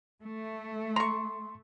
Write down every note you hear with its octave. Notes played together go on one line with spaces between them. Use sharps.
A3
A#5 C6 C#6